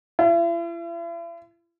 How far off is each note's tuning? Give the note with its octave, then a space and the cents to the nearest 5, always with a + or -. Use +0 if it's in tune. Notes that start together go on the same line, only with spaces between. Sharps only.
E4 +45